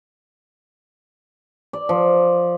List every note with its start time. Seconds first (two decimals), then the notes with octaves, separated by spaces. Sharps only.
1.73 D5
1.89 F3